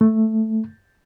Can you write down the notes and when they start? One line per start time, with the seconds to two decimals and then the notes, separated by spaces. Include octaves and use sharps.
0.01 A3